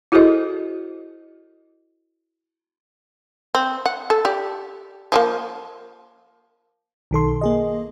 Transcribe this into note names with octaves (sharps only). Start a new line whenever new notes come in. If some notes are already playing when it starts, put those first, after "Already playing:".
E4 F#4 G#4 A4 C5 D#5
C4
F#5
A4
G4 D5
F3 A3 A#3
B1 D#3 A4 C6
A#3 G#4 D#5